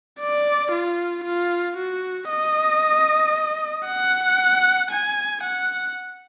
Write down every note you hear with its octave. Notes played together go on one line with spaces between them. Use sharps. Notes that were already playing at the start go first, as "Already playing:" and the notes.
D5
F4
F4
F#4
D#5
F#5
G#5
F#5